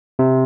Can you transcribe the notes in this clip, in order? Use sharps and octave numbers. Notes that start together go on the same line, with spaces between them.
C3